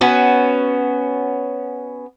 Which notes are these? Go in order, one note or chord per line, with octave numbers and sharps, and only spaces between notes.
B3 C#4 F#4